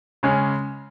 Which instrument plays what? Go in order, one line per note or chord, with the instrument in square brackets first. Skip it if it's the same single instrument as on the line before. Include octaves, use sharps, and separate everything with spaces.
[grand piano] C#3 G#3 C#4